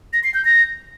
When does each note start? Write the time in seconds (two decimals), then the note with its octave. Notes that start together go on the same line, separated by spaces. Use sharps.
0.13 A#6
0.24 C7
0.34 G6
0.45 A#6